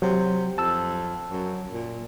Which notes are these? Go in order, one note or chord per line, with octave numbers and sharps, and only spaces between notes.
C3 F#3
F2 A5 E6
F#2
A#2